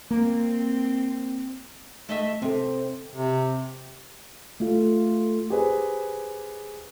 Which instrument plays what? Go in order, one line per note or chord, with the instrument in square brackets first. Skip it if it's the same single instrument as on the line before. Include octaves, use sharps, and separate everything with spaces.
[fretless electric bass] A#3 [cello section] C4
[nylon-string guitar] A3 D#5 E5
[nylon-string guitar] C3 [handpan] C4 A4
[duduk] C3
[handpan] A3 F4
[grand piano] G4 G#4 B4 C5